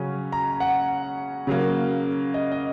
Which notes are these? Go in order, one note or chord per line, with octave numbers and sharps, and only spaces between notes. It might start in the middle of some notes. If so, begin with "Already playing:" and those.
Already playing: C#3 F#3 C#4
A#5
F#5
C#3 F#3 A#3
D#5
D#5